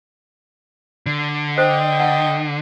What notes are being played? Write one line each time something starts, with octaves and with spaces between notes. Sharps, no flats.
D3
C5 D#5 G5
F#5